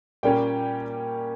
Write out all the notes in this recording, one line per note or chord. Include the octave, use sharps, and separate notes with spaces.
A#2 G3 A#3 C#4 G5